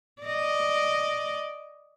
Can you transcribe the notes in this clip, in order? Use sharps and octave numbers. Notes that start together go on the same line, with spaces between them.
D5 D#5